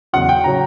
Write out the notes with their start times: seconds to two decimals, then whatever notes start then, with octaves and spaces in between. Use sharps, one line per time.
0.13 E2 C#3 F#3 F#5
0.29 G5
0.44 C#3 F#3 A#5